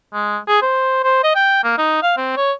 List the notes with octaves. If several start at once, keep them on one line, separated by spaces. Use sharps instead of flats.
G#3
G#4
C5
C5
D#5
G5
A#3
D#4
F5
C4
C#5